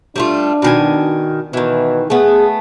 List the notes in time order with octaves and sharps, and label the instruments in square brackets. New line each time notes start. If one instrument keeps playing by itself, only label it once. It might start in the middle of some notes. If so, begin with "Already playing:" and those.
[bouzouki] G3 A3 F4 [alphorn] D4
[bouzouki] B2 D#3 G#5
[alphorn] B2 [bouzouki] D#3 E3
[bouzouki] A3 B3 [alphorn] G#4